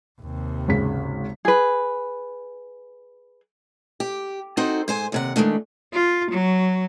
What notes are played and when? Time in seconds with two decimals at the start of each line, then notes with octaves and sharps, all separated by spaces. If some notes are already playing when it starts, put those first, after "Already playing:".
0.21 D#2 C3
0.68 G#1 C#3 B6
1.45 G#4 B4
4.00 G4
4.57 C4 D#4 F#4 A4 C5
4.88 G#2 C5 G#5
5.12 D#2 C3 F#5
5.36 D#3 F3 G#3 A3 D4
5.93 F4
6.31 F#3